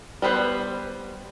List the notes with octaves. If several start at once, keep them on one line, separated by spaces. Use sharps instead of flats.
G3 B3 B4 C5